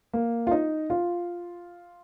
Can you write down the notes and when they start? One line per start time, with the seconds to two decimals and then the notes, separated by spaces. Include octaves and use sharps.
0.13 A#3
0.47 F4
0.51 D#4
0.90 F4